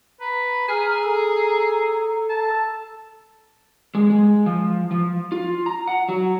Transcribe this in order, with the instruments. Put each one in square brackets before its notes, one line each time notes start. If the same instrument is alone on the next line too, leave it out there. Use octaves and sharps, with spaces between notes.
[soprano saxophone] B4 [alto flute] A#5
[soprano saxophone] G#4 [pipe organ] G#5 F6
[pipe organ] A4
[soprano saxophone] A5
[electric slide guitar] G#3
G#3
F3
F3
F4
A#5
F#5
F#3